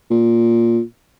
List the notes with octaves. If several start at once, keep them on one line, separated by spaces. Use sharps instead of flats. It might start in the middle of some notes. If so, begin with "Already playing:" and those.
A#2